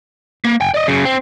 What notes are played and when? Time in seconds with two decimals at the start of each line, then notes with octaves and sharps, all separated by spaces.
0.45 A#3
0.61 G5 G#5
0.74 D5 D#5
0.87 F#2 C#3
1.05 C4